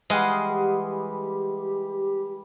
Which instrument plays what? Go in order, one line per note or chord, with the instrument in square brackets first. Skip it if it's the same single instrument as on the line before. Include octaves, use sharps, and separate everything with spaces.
[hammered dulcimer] E3 G3 [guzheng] G#3 [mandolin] D#5 F5 F#5
[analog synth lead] G4